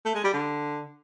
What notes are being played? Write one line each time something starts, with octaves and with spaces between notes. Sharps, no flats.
A3
G#3
G3
D3